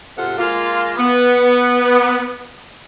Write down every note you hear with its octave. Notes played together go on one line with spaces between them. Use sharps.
G#2 C3 F4 A4 F#5
G#3 A#3 F4
B3